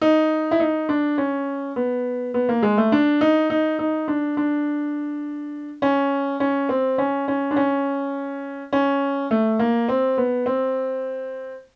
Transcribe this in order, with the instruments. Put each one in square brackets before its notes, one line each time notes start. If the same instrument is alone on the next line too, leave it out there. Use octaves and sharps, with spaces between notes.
[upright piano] D#4
E4
D#4
D4
C#4
B3
B3
A#3
G#3
A3
D4
D#4
D#4
D#4
D4
D4
C#4
C#4
C4
C#4
C#4
D4
C#4
C#4
A3
A#3
C4
B3
C4